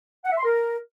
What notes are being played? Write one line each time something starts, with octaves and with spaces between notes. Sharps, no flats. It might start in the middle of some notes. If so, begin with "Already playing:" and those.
F#5
E5
C6
A#4